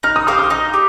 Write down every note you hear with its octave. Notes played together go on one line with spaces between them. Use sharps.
D#4 F6
D#6
G4 C5 F5 D#6
D#6
D#4 D#6
G4